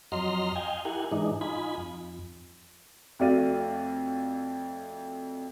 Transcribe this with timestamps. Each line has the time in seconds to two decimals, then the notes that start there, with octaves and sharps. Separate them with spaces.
0.12 F2 F#3 D#5 A#5 C6 F6
0.55 D#5 F5 G5 G#5
0.85 E4 G4 A#4 F#5 G#5
1.11 G#2 E3 G#3 D4 D#4
1.41 D#4 F4 G#5 B5
1.78 F2
3.19 F2 A3 F#4 D5 F5 D#7